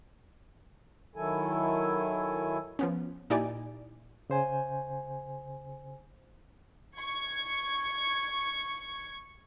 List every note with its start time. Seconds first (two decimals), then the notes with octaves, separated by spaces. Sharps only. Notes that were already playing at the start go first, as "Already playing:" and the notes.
1.16 D#3 F#3 E4 A4 G#5
2.79 F3 B3 C#4
3.30 A#2 D#4 E4 G4 D5 G#5
4.30 C#3 C5 G#5
6.98 C#6 G#6